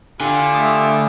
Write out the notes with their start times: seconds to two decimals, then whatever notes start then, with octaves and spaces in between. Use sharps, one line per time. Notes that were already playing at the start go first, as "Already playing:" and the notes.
0.20 D3 E4 F4 G4 G#5
0.54 A3 D#6